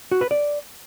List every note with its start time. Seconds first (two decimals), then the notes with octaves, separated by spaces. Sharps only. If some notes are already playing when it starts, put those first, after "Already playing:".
0.11 F#4
0.21 B4
0.31 D5